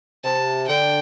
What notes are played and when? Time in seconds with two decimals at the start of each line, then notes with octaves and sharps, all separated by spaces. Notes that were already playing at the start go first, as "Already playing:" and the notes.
0.24 C3 A5
0.67 D3 G5